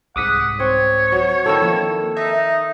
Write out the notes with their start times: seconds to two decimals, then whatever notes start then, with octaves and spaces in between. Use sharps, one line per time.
0.16 C2 G#2 F#5 D6 D#6 B6
0.60 C4 C#5
1.12 F#3
1.46 D#3 E4 A4 A5 E6
1.62 D#3 F3 A#3
2.17 D#4 E5